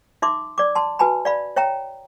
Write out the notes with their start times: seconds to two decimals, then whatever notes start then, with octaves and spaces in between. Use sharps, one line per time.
0.22 D#4 E5 C6 D6
0.58 D5 D6
0.75 A5 C6
0.99 F#4 B4 G#5 A5 B5
1.25 D5 F5 B5
1.56 C#5 E5 G5 A#5